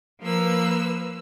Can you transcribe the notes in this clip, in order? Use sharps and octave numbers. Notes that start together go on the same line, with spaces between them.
F3 A#3 B4 E6